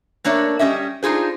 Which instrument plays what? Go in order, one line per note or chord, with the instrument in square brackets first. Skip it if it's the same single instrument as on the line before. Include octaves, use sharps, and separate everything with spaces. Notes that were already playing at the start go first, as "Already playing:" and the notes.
[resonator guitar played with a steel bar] A3 A#3 D4 C#5 D5
G3 C#4 D#5 E5
D4 D#4 F4 G#4 C5